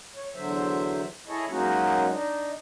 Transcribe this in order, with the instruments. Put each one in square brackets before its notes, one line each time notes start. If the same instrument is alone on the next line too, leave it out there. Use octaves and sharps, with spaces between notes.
[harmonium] C#5
E2 D3 F#3 C5 E5
E4 G#4 A4 C#5 D#5
F#3 G#3 A#3 C#4 D#4 F#4
D4 D#4